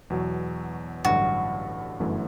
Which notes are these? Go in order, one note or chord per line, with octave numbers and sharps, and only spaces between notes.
E2 B2 F#3
A1 G2 D3 F#3 F#4
G1 F#2 E3 A3